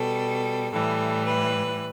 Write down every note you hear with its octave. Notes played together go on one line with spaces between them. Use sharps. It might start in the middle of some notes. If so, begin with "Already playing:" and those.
Already playing: B2 G3 A4
A2 E3 G3 A4
B4